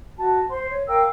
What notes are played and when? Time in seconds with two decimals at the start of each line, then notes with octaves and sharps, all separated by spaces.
0.17 F#4 A5
0.49 C5 C6
0.71 C#5
0.88 A#4 F5 G5 E6